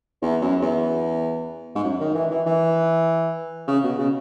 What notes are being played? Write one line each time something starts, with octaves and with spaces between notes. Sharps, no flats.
E2
F#2
E2
G#2
F#2
D#3
E3
E3
E3
C#3
B2
C#3